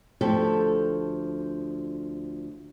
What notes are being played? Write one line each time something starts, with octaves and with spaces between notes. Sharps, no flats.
D2 F3 G4 A4